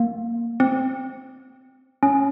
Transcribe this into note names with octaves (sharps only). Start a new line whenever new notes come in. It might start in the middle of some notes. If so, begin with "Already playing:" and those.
Already playing: A#3
C4
C#4